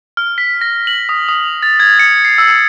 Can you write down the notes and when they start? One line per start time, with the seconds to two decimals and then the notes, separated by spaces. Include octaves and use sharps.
0.17 F6
0.38 B6
0.61 A#6
0.87 F#7
1.09 D#6
1.29 D#6
1.63 A6
1.80 G#6
1.99 C#7
2.25 C7
2.38 E6